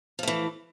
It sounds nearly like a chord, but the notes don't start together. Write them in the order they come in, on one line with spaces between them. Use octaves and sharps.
F3 A3 E3